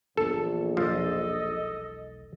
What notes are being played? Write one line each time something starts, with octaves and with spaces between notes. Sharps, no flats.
A#1 E3 B3 A4
E1 B1 F3 A4 D#5